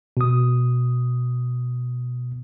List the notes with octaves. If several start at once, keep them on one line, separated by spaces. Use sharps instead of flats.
B2 D#6